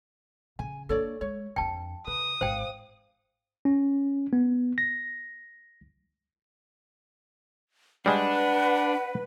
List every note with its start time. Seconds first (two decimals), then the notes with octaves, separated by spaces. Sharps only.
0.59 C#3 G#5
0.89 A#3 D4 A4 C#5 D5
1.21 G#3 C#5
1.56 F2 D4 G5 A5
2.07 C#3 B4 D#6
2.41 G#1 C5 F5 G5
3.65 C#4
4.33 B3
4.78 A#6
8.06 G3 G#3 D4 B4 F#5